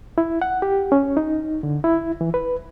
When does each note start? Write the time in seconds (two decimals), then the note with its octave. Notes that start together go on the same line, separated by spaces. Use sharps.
0.18 E4
0.42 F#5
0.62 G4
0.92 C#4
1.17 D#4
1.63 D3
1.84 E4
2.21 E3
2.34 B4